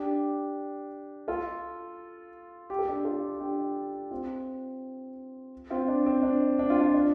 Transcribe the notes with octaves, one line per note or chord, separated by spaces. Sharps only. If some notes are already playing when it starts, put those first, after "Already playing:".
Already playing: D4 G4
F4 A4
G4
A4
D4 G4
F4 A4
D4 G4
C4 F4
C4 F4
D4
C4
D4
D4
F4
D4
D4